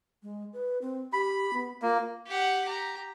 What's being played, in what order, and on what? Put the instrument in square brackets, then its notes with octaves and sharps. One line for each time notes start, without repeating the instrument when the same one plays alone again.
[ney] G#3
B4
C4
[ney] G4 [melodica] B5
[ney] B3
[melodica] A#3 [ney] F4
[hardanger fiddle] G4 F#5
G4 A#5